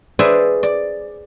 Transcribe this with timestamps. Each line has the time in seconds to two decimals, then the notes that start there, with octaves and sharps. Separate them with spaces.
0.19 G#4 B4 C5 D5 E5 G#5
0.63 D5